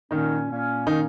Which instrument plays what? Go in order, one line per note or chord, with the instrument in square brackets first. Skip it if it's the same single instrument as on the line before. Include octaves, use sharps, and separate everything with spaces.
[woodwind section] A#2 A#3 C#4 [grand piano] D#3 D#4
[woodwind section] A#2 A#3 C#4
[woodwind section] A#2 A#3 C#4 [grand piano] D#3 D#4